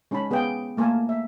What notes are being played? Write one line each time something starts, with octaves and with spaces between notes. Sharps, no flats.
G#3 C#4 D#4 A5 B5
B3 G#4 B4 F5 G5
A3 A#3 A#4 G#5 A5
E5